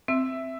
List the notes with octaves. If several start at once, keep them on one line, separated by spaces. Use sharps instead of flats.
C4 E5